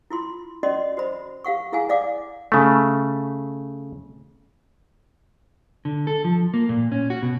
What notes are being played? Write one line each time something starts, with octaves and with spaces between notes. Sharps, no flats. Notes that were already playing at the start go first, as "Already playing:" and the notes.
E4 F4 C6
C#4 F#4 D5 D#5 C6
F#4 C5 B5
G4 F5 F#5 C#6
E4 G#4 F5 F#5 G#5
D5 F5 F#5 D6
C#3 A3
D3
A4
F3
A#3
A#2
C#4
F#4
B2